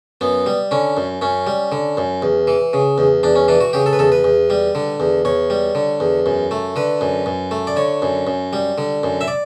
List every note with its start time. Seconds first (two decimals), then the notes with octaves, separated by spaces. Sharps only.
0.21 F#2 B3
0.46 G3
0.71 D3 C#4
0.97 F#2
1.21 F#2 C#4
1.47 G3
1.72 D3
1.97 F#2
2.22 E2
2.47 E3
2.73 C#3
2.98 E2
3.23 E2 D4
3.36 C#4
3.48 E3 D4
3.61 F#4
3.73 C#3 G4
3.86 A4
3.93 B4
3.99 E2 A4
4.12 B4
4.24 E2
4.50 G3
4.75 D3
5.00 E2
5.25 E2 C#5
5.50 G3
5.75 D3
6.00 E2
6.26 F#2
6.51 A3
6.76 D3 B4
7.01 F#2
7.26 F#2
7.51 A3
7.67 D5
7.76 D3 C#5
8.02 F#2
8.27 F#2
8.53 G3
8.78 D3
9.03 F#2
9.21 E5
9.28 D5